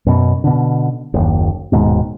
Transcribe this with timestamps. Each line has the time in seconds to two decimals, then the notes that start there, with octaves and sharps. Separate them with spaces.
0.06 F#2 B2
0.44 B2 D3
1.14 F#1 D#2
1.72 D#1 D#2 G#2 B2